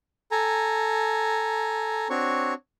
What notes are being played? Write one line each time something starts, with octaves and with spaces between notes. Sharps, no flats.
A4 G#5 A#5
C4 D4 F#4 C#5 C#6